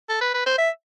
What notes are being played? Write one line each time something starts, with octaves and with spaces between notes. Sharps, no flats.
A4
B4
B4
C5
E5